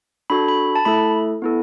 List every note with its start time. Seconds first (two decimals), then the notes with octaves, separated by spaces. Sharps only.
0.30 D4 F#4 A4 B5
0.48 B5
0.76 A5
0.85 A3 E4 A4 B5
1.42 B3 E4 A4